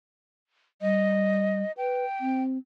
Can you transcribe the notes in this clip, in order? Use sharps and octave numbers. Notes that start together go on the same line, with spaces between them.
G3 D#5
B4 G5
C4